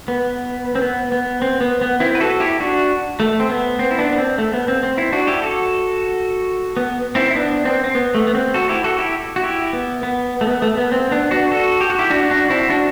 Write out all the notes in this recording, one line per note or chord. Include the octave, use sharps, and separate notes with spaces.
B3
C4
B3
B3
C4
B3
B3
C4 E4
B4
F#4 A4
E4 G4
D4 F#4
A3
C4
B3
C4
E4
B3 D4
B3
C4
A3
B3
C4
C4
C4 E4
D4 F#4
E4 G4
F#4 A4
B3
C4 E4
E4
B3 D4
C4
C4
B3
A3
B3
C4
F#4 A4
E4 G4
F#4 A4
E4 G4
F#4
E4 G4
B3
B3
A3
B3
A3
B3
C4
B3 D4
D4 F#4
F#4 A4
G4
F#4
E4 G4
D4 F#4
D4 F#4
C4 E4
D4 F#4